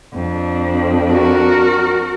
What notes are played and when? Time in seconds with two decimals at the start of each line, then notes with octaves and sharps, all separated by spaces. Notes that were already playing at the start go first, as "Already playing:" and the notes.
0.14 F2 D4
1.13 F#4 A#4